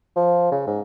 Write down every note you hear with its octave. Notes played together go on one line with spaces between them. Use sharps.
F3
C#3
G#2